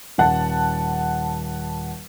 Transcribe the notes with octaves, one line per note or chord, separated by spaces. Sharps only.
D#1 F#5 A5